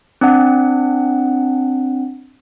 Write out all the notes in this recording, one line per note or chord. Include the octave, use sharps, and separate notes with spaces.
C4 D4 F#5